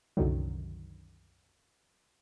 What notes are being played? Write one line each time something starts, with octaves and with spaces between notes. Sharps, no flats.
C2 F#2 D3 D#3 F#3